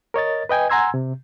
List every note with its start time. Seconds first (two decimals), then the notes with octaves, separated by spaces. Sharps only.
0.14 A#4 C#5 D#5 A6
0.49 B4 D#5 G5 G#5
0.70 F#5 G#5 A#5 C6 E6 G#6
0.94 C3